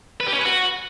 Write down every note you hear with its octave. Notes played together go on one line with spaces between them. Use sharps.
B4
G4
C#4
B4
F#4